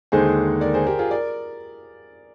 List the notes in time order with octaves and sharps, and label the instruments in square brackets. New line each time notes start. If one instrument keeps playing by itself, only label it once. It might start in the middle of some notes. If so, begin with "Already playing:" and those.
[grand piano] D#2 D3 G#3 D#4 [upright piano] G#4 C5
[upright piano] A#4 D5
G#4 C5
G4 A#4
F4 G#4
A#4 D5